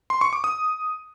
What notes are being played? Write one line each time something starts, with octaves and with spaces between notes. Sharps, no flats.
C6
C#6
D6
D#6